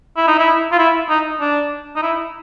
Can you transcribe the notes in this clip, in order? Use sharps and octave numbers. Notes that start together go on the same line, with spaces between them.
E4
D#4
E4
F4
E4
D#4
D4
D#4
E4